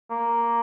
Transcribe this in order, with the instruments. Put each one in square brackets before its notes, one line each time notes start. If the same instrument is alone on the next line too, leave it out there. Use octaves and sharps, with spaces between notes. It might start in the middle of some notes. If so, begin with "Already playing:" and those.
[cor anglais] A#3